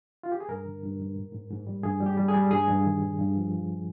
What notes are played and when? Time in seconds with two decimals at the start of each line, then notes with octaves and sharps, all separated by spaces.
0.23 F4
0.32 G4
0.40 G#4
0.48 G2 A#4
0.65 D3
0.83 G2
0.99 G2
1.16 G#2
1.33 G#2
1.50 G#2
1.67 G3
1.83 G2 G#4
2.01 G3
2.06 G4
2.17 G3
2.28 G#4
2.34 G3
2.51 G2 G#4
2.68 G2
2.84 D#3
3.01 G3
3.18 G2
3.35 F3
3.52 F3